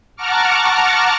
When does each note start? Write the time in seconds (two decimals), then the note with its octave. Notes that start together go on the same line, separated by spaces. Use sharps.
0.16 F#5 A5 A#5 C#6 D6 F6